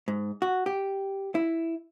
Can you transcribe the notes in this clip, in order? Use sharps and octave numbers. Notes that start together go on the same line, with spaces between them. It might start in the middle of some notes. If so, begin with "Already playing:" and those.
G#2
F#4
G4
E4